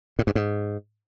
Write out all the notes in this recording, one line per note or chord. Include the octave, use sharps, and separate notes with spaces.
A2
G2
G#2